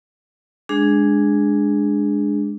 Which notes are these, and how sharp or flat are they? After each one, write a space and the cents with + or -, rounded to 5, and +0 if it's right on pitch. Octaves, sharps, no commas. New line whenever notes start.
G#3 +0 D4 +0 G#4 +0